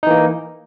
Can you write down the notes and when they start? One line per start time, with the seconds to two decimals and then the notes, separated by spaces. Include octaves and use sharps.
0.03 D#4
0.07 E3
0.10 A#3